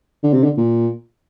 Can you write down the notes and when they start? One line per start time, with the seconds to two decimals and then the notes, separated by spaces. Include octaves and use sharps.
0.23 D3
0.33 C3
0.44 D3
0.57 A#2